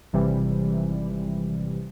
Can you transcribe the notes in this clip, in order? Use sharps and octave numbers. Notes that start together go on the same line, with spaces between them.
G#1 C3 E3 G3